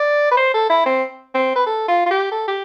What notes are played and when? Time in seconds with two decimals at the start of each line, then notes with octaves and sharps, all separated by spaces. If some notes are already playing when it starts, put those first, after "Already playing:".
Already playing: D5
0.32 B4
0.37 C5
0.54 A4
0.70 E4
0.86 C4
1.35 C4
1.56 B4
1.67 A4
1.88 F4
2.06 F4
2.11 G4
2.32 A4
2.48 G4